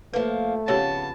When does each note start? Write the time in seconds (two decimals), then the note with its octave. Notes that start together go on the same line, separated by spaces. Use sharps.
0.14 F3 A3 A#3 B4
0.68 F2 C#3 B3 G4 C#5 A5